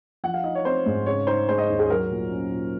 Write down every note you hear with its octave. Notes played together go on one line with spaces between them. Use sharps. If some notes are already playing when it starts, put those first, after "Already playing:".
F3 F#5
F5
D#4 D#5
C#5
C4 C5
G#2
C#3 C#5
D#4 C5
G#3 C5
D#5
D#2
G#4
F#3 A#4
A#2
C#4
A#2